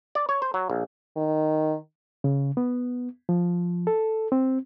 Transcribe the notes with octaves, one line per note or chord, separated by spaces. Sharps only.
D5
C#5
C5
F#3
A#1
D#3
C#3
B3
F3
A4
C4